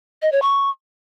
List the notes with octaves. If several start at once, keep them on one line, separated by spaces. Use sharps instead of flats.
D#5
C#5
C#6